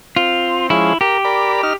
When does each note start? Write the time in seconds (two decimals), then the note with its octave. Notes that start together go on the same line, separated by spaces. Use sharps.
0.16 C4 F4
0.70 F3 G#3 C#4 E4
1.01 G4 A#4
1.25 A#4 D5 B5
1.63 D#4 F6